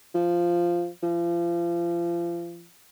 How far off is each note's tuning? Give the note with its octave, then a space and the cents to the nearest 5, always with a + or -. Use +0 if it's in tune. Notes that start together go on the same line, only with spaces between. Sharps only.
F3 -10
F3 -35